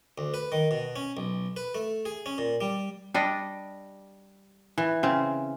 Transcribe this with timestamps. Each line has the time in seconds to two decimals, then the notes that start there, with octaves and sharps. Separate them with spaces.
0.18 D2
0.34 B4
0.52 D#3
0.71 B2
0.96 C#4
1.17 B1
1.57 B4
1.75 A3
2.05 G#4
2.26 C#4
2.38 A#2
2.61 G3
3.14 G3 D4 D#5
4.78 E3
5.03 C#3 C4